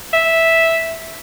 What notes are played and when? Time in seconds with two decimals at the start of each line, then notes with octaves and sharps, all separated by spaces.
0.13 E5